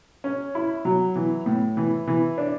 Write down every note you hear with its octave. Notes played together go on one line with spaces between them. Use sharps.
C#4
E4
F#3
E3
A2
E3
E3
D4